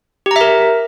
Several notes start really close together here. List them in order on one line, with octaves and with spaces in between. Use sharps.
G4 A#5 E5 A#4